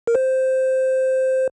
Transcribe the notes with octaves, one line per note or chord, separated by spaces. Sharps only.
A#4
C5